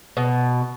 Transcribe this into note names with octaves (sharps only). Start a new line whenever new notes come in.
B2